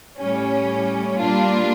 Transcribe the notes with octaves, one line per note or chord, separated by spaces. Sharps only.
A2 G3 C#4
A#2 G3 A#3 D4 F4